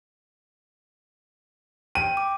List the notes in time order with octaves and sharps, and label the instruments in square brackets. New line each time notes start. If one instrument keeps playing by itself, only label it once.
[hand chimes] G5 [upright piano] D#7
[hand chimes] D6